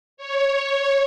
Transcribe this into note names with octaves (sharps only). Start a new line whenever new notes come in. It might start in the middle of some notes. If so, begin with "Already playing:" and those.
C#5